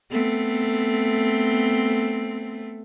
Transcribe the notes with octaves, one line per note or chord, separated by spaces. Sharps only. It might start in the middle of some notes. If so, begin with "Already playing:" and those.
A3 B3 C4